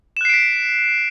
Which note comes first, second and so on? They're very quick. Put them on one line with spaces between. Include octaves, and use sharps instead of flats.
E7 F#6 C7 D7 B6